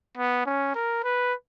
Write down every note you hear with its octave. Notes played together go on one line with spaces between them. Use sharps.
B3
C#4
A#4
B4